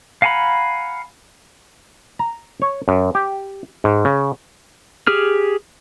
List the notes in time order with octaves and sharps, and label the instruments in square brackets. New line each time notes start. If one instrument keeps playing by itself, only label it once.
[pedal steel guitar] F5 F#5 G#5 A#5 B5
[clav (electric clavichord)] A#5
C#5
F#2
G4
G#2
C#3
[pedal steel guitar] G4 G#4 F6